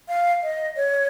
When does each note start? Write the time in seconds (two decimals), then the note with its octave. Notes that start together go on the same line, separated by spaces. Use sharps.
0.08 F5
0.43 D#5
0.76 C#5